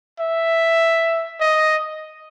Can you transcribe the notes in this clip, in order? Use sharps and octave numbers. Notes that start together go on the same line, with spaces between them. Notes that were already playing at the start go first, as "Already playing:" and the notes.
E5
D#5